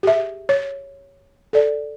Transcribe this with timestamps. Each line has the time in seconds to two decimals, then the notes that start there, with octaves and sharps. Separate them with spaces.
0.03 G4 G#4 E5
0.49 C#5
1.53 A4 D5